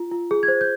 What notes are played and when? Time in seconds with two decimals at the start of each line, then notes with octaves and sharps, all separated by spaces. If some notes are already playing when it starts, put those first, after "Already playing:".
Already playing: F4
0.11 F4
0.31 G#4
0.43 G#6
0.48 C5
0.61 G6